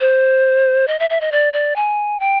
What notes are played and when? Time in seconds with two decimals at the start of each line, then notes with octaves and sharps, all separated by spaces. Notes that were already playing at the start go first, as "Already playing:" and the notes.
0.01 C5
0.88 D#5
1.00 E5
1.10 E5
1.21 D#5
1.32 D5
1.53 D5
1.76 G#5
2.20 G5